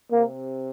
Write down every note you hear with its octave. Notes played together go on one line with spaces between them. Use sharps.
C3 A#3